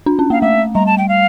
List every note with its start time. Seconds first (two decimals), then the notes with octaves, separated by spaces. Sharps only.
0.06 D4
0.19 C#4
0.30 A#3 F5
0.41 A3 E5
0.75 G3 A#5
0.86 A5
0.98 G5
1.09 F5